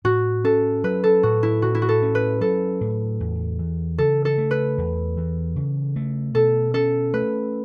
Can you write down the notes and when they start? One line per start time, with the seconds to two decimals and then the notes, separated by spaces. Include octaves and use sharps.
0.05 A2 F#4
0.44 C#4 A4
0.84 F#3 B4
1.04 A4
1.23 A2 F#4
1.43 E4
1.62 A2 F#4
1.75 E4
1.82 F#4
1.89 A4
2.02 C#4
2.15 B4
2.41 F#3 A4
2.81 A2
3.20 E2
3.59 E3
3.98 C#3 A4
4.25 A4
4.38 A3
4.51 B4
4.78 E2
5.17 E3
5.56 C#3
5.96 A3
6.35 B2 A4
6.74 C#4 A4
7.14 A3 B4